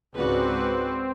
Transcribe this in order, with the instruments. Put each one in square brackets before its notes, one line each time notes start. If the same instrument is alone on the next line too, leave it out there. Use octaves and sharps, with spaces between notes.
[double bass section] C#2 G#2 C#3 [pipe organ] C4 [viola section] F#4 B4 D5